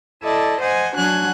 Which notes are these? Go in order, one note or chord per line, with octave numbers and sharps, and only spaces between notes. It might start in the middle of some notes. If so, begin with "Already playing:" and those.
E4 A4 D5 D#5
C5 D#5 F#5 G#5
F#3 D4 F#4 G#5 F#6 G#6